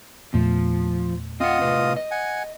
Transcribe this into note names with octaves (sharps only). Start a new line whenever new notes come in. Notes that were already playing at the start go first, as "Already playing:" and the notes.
E2 A#2 F3 A3
C4 F4 D#5 F#5
A2 C3 B4
D#5
F#5 G#5